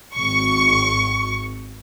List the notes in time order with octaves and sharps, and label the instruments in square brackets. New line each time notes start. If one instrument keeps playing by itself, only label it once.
[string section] G#1 C#6